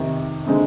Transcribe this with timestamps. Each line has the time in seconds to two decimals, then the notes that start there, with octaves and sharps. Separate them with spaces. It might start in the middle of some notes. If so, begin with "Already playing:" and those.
Already playing: F2 C3 D#3
0.47 D3 G#3 C4 D#4